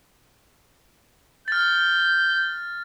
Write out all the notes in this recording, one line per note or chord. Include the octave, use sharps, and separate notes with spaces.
F6 G6 A6